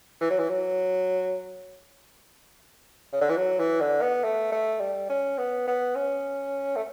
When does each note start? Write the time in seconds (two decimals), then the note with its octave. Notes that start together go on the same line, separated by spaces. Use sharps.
0.21 E3
0.30 F#3
0.38 E3
0.49 F#3
3.13 C#3
3.21 D3
3.29 E3
3.37 F#3
3.59 E3
3.80 D3
4.02 B3
4.24 A3
4.52 A3
4.80 G3
5.10 C#4
5.38 B3
5.67 B3
5.96 C#4
6.76 A3